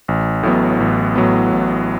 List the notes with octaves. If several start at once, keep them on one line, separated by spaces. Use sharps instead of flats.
A1
A2 F#3 B3
A1
A2 F#3 B3
A1